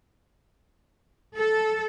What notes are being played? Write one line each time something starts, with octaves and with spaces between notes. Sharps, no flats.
A4